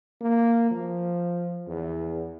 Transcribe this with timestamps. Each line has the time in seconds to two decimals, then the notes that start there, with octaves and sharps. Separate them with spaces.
0.21 A#3
0.71 F3
1.67 E2